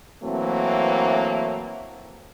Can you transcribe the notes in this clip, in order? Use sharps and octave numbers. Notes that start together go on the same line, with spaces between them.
E3 F#3 A3 A#3 C4